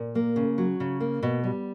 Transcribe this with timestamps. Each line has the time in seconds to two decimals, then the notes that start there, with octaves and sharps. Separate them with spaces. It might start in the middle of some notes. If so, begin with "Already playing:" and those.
Already playing: A#2
0.15 A#3
0.36 C#3
0.58 F#3
0.80 C#3
1.00 A#3
1.23 B2
1.44 G3